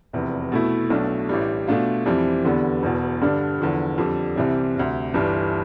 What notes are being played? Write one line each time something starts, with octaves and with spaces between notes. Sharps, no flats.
F1 E2 C3
B2 A3 E4
B1 B2 A3 D4
A1 A2 G3
B2 A3 D4 F4
F2 E3 G3 C4
E2 D3 G3 B3
E1 E2 B2
G2 D3 G3 D4
E2 D3 F3
F2 D3 G3
C2 C3 E3 G3 C4
D2 C3 G3
G1 G2 E3 G3